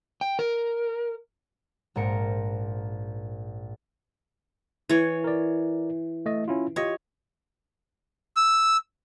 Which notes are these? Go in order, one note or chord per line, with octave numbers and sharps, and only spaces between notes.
G5
A#4
A#1 G#2 A#4 C#7
E3 C#5
A#4 D5
A3 D#5
C#4 E4 F4
F4 G4 C#5 D#5
E6